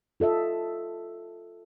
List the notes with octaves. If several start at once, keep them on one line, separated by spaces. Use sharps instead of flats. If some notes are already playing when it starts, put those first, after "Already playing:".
F4 A4 D#5 E5